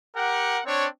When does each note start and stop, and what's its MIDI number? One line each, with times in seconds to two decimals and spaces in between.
0.16 0.60 67
0.16 0.60 70
0.16 0.60 78
0.65 0.87 60
0.65 0.87 62
0.65 0.87 73